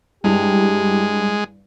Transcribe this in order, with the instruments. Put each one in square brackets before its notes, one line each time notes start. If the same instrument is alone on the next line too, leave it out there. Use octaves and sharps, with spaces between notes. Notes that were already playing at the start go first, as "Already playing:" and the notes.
[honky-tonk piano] G2 E4 F7 [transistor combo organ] G#3 [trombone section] G4